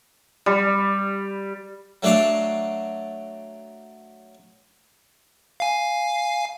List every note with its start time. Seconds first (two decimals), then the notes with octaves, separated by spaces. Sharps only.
0.46 G3
2.03 F#3 A3 D4 D5 F5 A5
5.60 F5 G#5